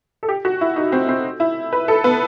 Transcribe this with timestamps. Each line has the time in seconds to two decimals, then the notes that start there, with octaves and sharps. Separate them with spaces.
0.23 A4
0.28 G4
0.45 F#4
0.61 E4
0.76 D#4
0.92 C4
1.08 C4
1.40 E4
1.73 B4
1.88 A4
2.04 B3